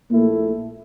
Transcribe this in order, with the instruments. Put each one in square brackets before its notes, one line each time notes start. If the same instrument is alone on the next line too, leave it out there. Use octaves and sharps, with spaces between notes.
[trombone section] A#1 A#2 A3 E4 [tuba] A#3